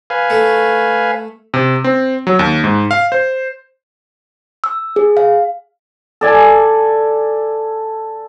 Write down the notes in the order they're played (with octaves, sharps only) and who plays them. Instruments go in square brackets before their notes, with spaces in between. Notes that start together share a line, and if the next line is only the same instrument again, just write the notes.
[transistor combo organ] B4 F5 G#5
[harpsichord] A3
[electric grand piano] C3
C4
F#3
D#2
G#2
F5
C5
[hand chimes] E6
G#4
F5
[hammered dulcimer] A4 D5 G#5